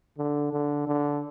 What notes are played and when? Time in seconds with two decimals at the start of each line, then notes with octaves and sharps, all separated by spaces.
0.18 D3
0.53 D3
0.87 D3